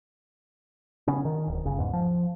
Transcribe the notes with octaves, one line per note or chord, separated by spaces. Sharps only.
C#3 B3 C#4
D#3
D1
G1 C#3
E2 G#2
F3